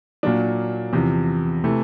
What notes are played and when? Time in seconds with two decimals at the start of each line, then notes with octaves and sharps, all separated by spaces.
0.23 A#2 F#3 A#3 D4
0.93 E2 C3 F3
1.64 C3 E3 A3